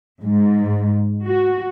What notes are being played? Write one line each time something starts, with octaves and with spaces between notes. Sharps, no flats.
G#2
F#4